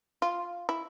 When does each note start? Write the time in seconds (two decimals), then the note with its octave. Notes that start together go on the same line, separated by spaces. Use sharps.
0.22 F4
0.69 E4